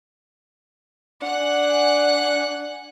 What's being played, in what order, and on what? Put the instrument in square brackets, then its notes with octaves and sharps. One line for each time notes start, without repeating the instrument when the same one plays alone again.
[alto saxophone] D4 [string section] F#5 G#5 F#6